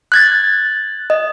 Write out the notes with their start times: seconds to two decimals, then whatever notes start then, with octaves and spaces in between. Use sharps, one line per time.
0.12 F#6 G#6 A6
1.10 D#5